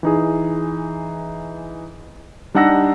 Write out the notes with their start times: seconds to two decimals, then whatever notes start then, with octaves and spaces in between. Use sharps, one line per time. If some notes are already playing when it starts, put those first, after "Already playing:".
0.03 E3 D#4 G#4
2.54 G3 D4 D#4 F#5 E6 A#6